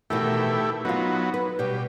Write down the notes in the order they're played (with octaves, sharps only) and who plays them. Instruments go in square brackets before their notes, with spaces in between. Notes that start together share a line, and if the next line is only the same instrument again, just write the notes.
[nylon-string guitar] B2 D#3 E3 [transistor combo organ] A3 E4 G4
[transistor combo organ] F#3 B3 [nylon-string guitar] D#4 F4
[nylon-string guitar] B4
[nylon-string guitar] B2 G3 [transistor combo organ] G4